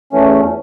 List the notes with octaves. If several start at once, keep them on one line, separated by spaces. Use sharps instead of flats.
E2 E3 A3 C#4